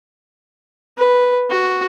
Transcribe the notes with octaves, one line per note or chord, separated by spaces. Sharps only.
B4
F#4